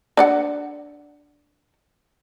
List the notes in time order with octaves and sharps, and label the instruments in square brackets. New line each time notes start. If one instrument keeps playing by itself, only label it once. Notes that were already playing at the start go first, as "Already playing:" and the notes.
[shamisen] D4 D5 F#5